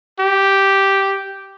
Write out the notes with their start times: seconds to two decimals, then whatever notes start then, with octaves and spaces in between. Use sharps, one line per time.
0.19 G4